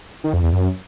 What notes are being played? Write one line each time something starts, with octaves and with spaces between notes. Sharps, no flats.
D#3
F2
E2
F#2